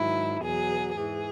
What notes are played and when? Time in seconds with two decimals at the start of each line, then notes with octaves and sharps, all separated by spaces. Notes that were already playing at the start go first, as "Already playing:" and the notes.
Already playing: G#2 D#3 F#3 E4
0.43 E2 B2 F#3 G#4
0.96 G#2 E3 G#4